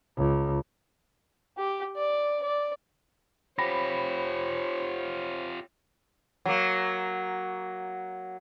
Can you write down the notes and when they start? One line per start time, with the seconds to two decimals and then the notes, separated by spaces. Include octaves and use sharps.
0.17 C#2
1.58 G4
1.96 D5
2.43 D5
3.58 F4 G4 C5 C#5 B5 A#6
6.45 F#3 A#3